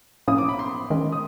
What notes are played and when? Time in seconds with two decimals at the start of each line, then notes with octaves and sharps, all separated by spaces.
0.28 A2 F3 A#3 C#4 E4 D#6
0.38 D6
0.49 B5
0.59 C6
0.90 D#3 G#3 C#4
1.12 D#6